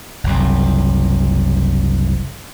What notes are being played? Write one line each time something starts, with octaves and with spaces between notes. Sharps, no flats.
F#1 C2